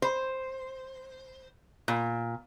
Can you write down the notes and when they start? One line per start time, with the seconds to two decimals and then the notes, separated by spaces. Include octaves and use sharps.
0.02 C5
1.88 A#2